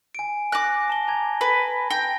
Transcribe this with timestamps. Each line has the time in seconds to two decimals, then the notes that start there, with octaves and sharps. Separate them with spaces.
0.15 G#5 D7
0.52 G#5 D6 F#6 A#6
0.90 A5 G7
1.07 G#5 A#5 G#6
1.41 B4
1.90 G5 A#6